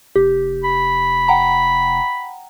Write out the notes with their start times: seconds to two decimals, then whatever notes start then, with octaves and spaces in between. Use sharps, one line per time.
0.16 F1 G4
0.64 B5
1.28 F#5 G5 A#5